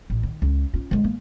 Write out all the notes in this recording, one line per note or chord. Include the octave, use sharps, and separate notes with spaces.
A1
D#3
C#2
C#4 F4
D3 G#3
A#3